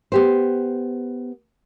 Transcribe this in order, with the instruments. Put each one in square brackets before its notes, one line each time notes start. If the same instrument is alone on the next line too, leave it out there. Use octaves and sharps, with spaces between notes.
[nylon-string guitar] B3 G4 C5